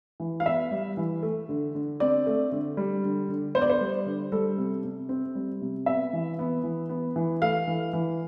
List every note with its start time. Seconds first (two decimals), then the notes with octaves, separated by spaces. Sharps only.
0.20 E3
0.40 F5
0.46 B3 E5
0.71 G3
0.97 E3
1.23 A3
1.49 D3
1.75 D3
2.00 C4 D5
2.26 A3
2.52 D3
2.77 G3
3.04 D3
3.29 D3
3.55 B3 C5
3.62 D5
3.70 C5
3.81 G3
4.06 D3
4.32 G3 A4
4.58 C3
4.84 C3
5.09 C4
5.35 G3
5.61 C3
5.86 B3 E5
6.13 E3
6.39 B3
6.64 E3
6.89 B3
7.16 E3
7.42 A3 F5
7.67 E3
7.93 E3